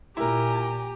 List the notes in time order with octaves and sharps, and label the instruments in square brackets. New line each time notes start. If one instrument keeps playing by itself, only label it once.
[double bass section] A#2 [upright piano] E4 A#4 [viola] G4 [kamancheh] G#5 A#5